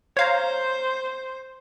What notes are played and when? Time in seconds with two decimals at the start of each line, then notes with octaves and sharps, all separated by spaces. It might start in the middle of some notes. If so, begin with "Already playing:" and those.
0.17 C5 C#5 F5 A#5